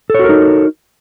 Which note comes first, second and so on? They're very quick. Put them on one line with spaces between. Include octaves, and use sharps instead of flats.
A4 C#5 F#4 A#4 D#4